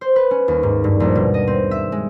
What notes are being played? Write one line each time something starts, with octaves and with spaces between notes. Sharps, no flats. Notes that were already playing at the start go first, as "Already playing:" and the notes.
C5
B4
C#4
D#2
G#2
G2
A#1
B2
D#5
C4
E5
G#3